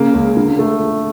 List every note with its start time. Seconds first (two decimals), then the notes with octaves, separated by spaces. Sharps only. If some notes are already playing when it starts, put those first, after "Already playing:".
Already playing: C#3 A#3
0.14 C#2
0.37 D3
0.59 A3